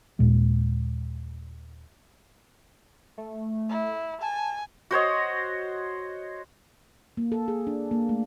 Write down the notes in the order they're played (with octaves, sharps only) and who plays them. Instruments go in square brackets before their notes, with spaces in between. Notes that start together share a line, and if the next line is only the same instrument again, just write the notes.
[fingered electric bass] D#2 A#2 G#3
[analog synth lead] A3
[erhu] E4
[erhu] G#5 [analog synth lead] A5
[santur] F#4 C5 C#5 D#5
[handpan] A#3
A4
G#4
D4
A#3
A3